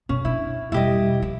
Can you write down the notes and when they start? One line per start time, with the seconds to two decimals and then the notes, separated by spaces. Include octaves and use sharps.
0.09 F#2 B2 C#4
0.25 D4 E4
0.72 E1 G3 E4 G4 D#5
1.22 F3 E4